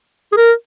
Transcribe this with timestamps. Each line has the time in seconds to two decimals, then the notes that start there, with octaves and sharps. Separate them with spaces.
0.32 G#4
0.37 A#4